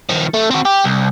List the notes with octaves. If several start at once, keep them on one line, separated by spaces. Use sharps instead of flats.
D#3 F3
A3
C4 F#4
G4
C2